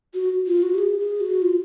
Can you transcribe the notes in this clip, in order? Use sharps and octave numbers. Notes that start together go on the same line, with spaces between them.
F#4
F4
F#4
G4
G#4
G#4
F#4
F4